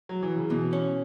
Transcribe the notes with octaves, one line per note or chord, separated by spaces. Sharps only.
F#3
E3
C#3
B2 E3
C#4